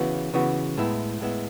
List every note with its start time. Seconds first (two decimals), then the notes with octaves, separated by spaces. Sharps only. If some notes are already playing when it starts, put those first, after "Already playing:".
Already playing: C#3 E3 B3 F#4
0.34 C#3 E3 B3 F#4
0.77 A2 G#3 B3 E4
1.20 A2 G#3 B3 E4